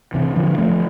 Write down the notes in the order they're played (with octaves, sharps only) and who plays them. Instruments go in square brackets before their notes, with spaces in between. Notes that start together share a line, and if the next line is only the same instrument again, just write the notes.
[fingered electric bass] C3 E3
D3 F3
F3 A3